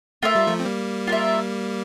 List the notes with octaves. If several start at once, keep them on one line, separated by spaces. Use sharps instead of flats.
A3 F4 A#4 E5
G3
F3 A3
C4
G3 A#3
F4 A#4 E5